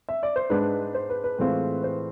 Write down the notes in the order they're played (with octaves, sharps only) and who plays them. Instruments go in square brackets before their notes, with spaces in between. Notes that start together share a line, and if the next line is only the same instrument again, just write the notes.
[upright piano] E5
D5
C5
G#2 G#3 D4 B4
C5
B4
B4
A2 E3 G#3 C4 F4
C5